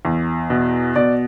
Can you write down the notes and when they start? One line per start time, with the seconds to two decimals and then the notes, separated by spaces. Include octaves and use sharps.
0.05 E2
0.50 B2
0.96 B2 D5